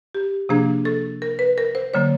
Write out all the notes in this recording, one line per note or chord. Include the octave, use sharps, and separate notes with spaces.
G4
C3 F3 A#3 D4 G#4
A4
A#4
B4
A#4
C5
D3 F#3 A#3 C#5